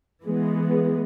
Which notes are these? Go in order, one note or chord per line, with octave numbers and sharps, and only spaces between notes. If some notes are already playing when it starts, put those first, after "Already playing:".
E3 G#3 B3